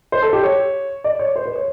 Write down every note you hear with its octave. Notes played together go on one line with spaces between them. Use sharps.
C5
A4
G4
C#5
D5
C#5
C5
B4
C#5